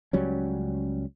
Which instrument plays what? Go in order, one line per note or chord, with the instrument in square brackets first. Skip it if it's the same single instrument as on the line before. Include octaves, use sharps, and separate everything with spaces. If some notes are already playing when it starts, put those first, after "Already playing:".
[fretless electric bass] C#2 F#3 G3 C#4